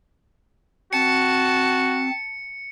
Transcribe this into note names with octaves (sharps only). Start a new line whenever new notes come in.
C4 F#4 A5 C#7